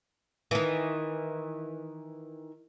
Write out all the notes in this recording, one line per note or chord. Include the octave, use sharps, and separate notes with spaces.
D#3 E3